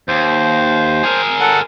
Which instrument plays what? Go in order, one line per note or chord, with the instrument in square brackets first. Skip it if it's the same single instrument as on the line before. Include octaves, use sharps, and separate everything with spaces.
[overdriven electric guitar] D#2 [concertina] C5
[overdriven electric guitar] G#4 A#4
[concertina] A4 F#5